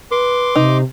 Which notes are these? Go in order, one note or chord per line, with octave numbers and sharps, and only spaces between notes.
B4 C6 D6
C3 D#4